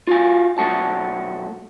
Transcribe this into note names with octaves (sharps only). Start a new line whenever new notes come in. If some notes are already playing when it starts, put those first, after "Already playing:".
F4 F#4 F5 G#5
B1 G#3 A3 F#4 A5